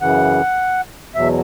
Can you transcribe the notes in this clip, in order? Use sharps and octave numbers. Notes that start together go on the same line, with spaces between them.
F#2 C#3 E3 F#5
E2 B2 F#3 E5